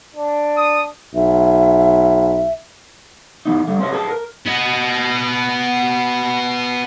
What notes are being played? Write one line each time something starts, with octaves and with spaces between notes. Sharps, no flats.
D4
D#6
B1 E5
E3 B3 D#4
D3 G3
C4 C#4 B4 D#5
G#4 B4 A5
A#4
B3 D#5